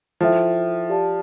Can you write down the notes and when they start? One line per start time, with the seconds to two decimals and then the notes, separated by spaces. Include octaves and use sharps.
0.20 F3 E4 A4 C5 E5 G5
0.89 G4 D5 F5 A5